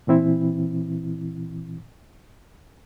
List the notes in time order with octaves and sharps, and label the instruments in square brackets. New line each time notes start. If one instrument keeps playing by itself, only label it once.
[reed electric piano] A#2 E3 C4 E4